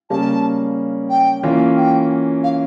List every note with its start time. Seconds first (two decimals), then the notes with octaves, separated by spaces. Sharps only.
0.10 C#3 G3 A#3 C#4 A5
1.10 G5
1.43 E3 A#3 C#4 F4
1.76 G5
2.43 F5